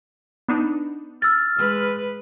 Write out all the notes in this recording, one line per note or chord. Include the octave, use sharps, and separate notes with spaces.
B3 D4 D#4
E6 F6 A6
G#3 B4